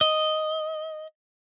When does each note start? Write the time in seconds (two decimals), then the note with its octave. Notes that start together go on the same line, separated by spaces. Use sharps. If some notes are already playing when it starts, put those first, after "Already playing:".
0.01 D#5